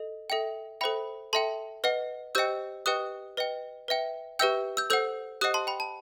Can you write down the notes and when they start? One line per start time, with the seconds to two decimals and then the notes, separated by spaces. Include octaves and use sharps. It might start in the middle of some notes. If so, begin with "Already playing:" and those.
Already playing: A4 D#5
0.30 A4 E5 G5
0.81 A4 C5 E5 G5 B5
1.33 A4 E5 G5 A5 C6
1.84 B4 D#5 F#5
2.35 G4 C5 D#5 G5 E6 G6
2.86 G4 B4 D#5 G5 D#6 F#6
3.37 B4 D#5 G5
3.88 B4 E5 G5
4.39 G4 B4 E5 G5 E6 G6
4.77 E6 G6
4.90 A4 C5 F#5 E6 G6
5.41 G4 C5 D#5 F#5 D#6 F#6
5.54 A5 C6
5.67 G5 B5
5.80 A5